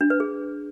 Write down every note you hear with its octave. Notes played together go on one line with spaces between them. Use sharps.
D4
B4
G#4